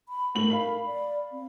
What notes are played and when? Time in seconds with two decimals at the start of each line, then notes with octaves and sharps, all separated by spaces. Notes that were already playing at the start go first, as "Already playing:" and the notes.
0.09 B5
0.35 A2 A#4 F#7
0.50 F5 B5
0.86 D5
1.32 C4